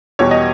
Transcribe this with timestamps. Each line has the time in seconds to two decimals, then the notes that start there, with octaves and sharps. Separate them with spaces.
0.19 E2 B2 G3 C#5
0.31 D#5